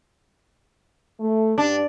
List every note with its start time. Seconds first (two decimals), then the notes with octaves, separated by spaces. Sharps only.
1.20 A3
1.58 G2 D4